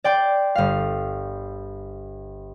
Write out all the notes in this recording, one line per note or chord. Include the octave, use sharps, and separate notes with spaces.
D5 G5 C6
G1 F5